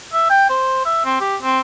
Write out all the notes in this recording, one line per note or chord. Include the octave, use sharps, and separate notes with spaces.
E5
G5
C5
E5
C4
G4
C4